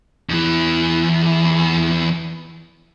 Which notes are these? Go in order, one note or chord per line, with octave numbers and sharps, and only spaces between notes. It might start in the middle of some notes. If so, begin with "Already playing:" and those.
E2 E3